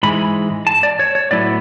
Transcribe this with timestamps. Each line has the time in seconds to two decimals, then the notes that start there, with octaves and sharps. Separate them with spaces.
0.03 G#2 E3 G#3 B5
0.67 A5
0.83 D5
0.99 C#5
1.15 C#5
1.31 A2 F#3 B3 E4 D5